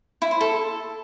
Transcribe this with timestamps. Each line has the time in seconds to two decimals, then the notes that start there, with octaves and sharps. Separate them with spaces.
0.22 E4
0.31 C5
0.41 A4